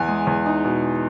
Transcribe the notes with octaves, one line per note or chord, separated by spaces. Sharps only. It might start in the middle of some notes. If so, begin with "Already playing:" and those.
Already playing: E2 G#5
G#3
E2
D#4
B2